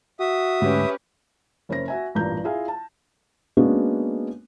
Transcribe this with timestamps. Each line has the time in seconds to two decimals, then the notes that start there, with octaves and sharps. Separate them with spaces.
0.20 F#4 E5 D#6
0.62 D2 G#2 C#4 G4 B4
1.69 F#1 C#4 C5 A#6
1.88 F#4 E5 G#5
2.15 A1 G2 A#2 A#5 G6
2.44 E4 F4 G#4 E5 F5 G#5
2.68 A5
3.57 G#3 A#3 B3 C#4 D4 F#4